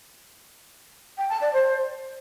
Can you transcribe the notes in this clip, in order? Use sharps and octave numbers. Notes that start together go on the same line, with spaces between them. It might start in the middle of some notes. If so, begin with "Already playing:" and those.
G5
A5
D5
C5